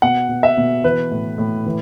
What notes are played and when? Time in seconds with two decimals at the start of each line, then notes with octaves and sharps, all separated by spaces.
0.02 B2 F#5
0.29 B2
0.43 E5
0.57 B2
0.84 E3 B4
1.11 A2
1.38 A2
1.66 E3